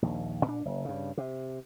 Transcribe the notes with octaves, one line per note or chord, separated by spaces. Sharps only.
A#1 D#2
A#2 D4
F#1
G2 C#3
C3